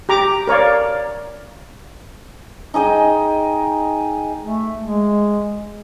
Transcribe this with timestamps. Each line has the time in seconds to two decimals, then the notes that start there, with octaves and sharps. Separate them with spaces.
0.09 G4 A#5 D6
0.47 A#4 C#5 D5 F5
2.74 D#4 G#4 D#5 G5
4.41 A3
4.81 G#3